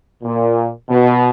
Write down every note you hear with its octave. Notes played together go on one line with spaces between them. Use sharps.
A#2
B2